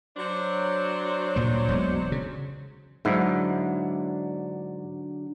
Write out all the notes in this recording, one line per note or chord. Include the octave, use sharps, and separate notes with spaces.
F#3 D4 C5
D2 A#2 G3
E1 B1 G#3
C#3
G#2 D3 F#3 D4 E4